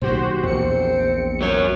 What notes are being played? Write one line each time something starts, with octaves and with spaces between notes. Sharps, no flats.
B1 A#2 D#3 F#4 G4 C5
A#1 E2 C4 C#7
F#3 A#4 C#5